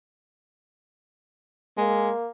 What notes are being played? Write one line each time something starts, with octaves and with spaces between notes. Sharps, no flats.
G#3 A#3